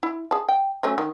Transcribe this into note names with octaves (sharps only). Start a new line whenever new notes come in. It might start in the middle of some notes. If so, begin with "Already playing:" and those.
E4
G#4 A5
G5
F#3 A3 C#4
D#3